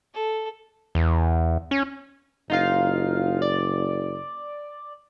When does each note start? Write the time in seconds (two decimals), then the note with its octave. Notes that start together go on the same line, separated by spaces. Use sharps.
0.14 A4
0.95 E2
1.71 C#4
2.50 F#1 D#4 F4 F5
3.42 D5